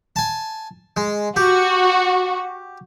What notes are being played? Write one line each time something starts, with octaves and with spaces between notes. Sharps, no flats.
G#5 A5
G#3
F#4 G4